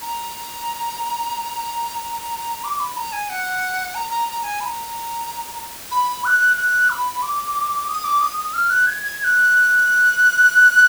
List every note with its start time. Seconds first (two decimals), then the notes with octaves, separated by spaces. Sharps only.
0.01 A#5
2.64 D6
2.80 B5
2.97 A#5
3.12 G#5
3.29 F#5
3.95 A#5
4.10 A#5
4.28 A#5
4.43 G#5
4.60 B5
4.65 A#5
5.91 B5
6.25 F#6
6.57 F#6
6.90 B5
7.22 D6
7.88 D#6
8.04 D6
8.21 D#6
8.38 D#6
8.54 F6
8.70 F#6
8.87 G#6
9.03 G#6
9.20 G#6
9.24 F#6